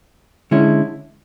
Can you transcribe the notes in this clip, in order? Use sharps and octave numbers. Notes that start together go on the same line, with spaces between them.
D3 G#3 C#4 E4